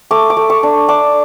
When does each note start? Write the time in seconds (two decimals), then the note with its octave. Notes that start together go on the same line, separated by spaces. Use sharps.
0.11 A3 D6
0.30 D6
0.37 A3
0.50 C#6
0.63 D4
0.88 D4 D6